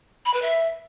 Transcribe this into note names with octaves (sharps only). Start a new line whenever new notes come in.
B5
B4
E5